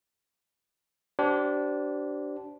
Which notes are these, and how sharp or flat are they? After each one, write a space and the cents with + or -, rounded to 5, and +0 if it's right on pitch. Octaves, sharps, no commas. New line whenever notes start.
D4 -15 G4 -35 C5 -20